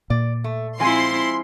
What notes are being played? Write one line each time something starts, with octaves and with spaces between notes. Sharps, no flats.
A#2 D5
A3
F3 G#3 C4 E4 G#5 C6